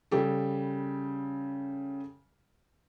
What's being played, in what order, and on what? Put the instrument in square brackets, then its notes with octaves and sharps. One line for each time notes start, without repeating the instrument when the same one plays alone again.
[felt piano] C#3 G3 G4 A4